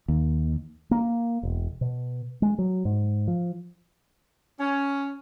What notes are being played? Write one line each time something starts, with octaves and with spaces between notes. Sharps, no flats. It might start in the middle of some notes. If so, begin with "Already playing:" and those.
D#2
A#3
E1
B2
G#3
F#3
G#2
F3
C#4